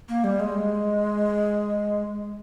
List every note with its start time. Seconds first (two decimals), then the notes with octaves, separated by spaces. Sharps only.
0.09 A#3
0.24 G3
0.40 G#3